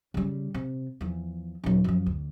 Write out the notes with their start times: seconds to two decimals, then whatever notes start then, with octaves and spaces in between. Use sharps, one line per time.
0.14 C#3 G3
0.54 C3
1.01 E2 F3
1.64 D#1 F#3
1.84 F#2 F3
2.06 D2